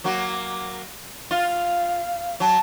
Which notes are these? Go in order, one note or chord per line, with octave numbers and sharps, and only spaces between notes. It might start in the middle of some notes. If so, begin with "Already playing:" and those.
F#3 A#3 F#4
F4 F5
F#3 A5